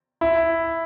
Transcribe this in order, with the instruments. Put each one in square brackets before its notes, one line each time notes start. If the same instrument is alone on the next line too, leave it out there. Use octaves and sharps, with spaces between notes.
[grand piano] E4